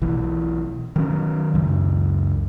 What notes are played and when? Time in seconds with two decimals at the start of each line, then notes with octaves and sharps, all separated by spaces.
0.02 B1 E3
0.96 D#3 F#3 C#4
1.54 C#2 F#2